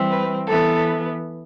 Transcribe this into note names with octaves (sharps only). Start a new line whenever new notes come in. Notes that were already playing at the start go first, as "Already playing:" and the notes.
Already playing: E3 G3 C4
B4
E3 B3 A4